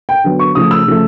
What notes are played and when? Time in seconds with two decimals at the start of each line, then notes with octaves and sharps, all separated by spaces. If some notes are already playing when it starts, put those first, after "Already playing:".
0.09 G5
0.24 D3 F#3 B3
0.39 C#6
0.55 C#3 F3 A3 D#6
0.71 E6
0.86 C#3 F3 A3